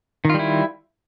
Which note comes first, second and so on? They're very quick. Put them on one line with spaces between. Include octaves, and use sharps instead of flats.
D#3 F4 G3 E4